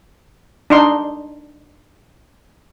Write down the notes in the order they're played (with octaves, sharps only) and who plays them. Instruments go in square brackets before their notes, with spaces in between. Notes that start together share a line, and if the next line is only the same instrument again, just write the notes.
[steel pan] D4 D#4 C6